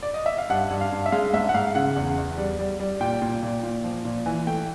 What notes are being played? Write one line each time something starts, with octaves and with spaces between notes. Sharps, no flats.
D5
D#5
E5
F5
G2 F#5
G2
F5
G2
E5
G#3 F5
G#2 E5
F#5
G#2 F5
C#3 F#5
E2
E2
G3
G3
G3
A#2 G5
A#2
A#2
A#2
F3
A#2
E3 G#5
A3 G5